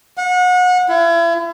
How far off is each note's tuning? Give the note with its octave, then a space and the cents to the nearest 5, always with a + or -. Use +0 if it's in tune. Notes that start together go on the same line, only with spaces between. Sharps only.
F#5 -30
E4 +40